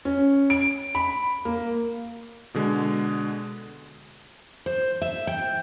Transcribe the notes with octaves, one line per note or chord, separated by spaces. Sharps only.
C#4
D7
B5
A#3
B2 D3 G#3
C5
E5
G5